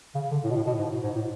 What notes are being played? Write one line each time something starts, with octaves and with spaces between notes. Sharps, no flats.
C#3
D3
A2
B2
A2
B2
G#2
G#2
A2